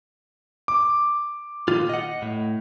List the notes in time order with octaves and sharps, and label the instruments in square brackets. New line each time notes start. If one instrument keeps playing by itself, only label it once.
[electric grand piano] D6
[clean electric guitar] A#2 D#3 F4
D#5 F#5
A2